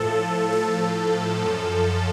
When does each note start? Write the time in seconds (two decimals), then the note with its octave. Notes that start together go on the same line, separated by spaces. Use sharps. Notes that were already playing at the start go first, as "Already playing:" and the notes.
Already playing: A2 F3 A4
0.52 A4
1.42 F#2 F3